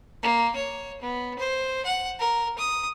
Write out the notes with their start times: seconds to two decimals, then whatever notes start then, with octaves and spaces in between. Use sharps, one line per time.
0.23 A#3
0.55 C#5
1.02 B3
1.39 C5
1.85 F#5
2.19 A#4
2.58 D#6